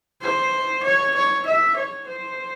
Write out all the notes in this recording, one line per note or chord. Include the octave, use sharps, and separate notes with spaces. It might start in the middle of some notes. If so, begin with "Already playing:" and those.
C5
C#5
C#5
E5
C#5
C5